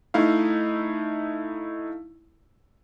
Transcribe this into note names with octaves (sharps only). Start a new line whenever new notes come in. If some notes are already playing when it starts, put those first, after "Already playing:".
A3 D#4 E4 F5